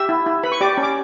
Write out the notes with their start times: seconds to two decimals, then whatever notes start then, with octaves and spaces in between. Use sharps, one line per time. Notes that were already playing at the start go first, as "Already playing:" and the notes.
Already playing: G4 E5 E6
0.09 E4
0.26 E4
0.43 B4 B5
0.52 C#6
0.61 G4 D5 D6
0.77 C#4
0.83 D6